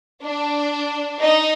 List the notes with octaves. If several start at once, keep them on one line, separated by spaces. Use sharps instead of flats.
D4
D#4